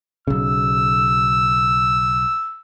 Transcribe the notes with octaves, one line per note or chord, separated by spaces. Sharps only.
B1 C#3 E6